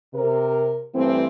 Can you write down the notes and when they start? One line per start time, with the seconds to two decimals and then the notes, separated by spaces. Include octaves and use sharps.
0.14 C3 A#4
0.94 G2 E3 A3 C4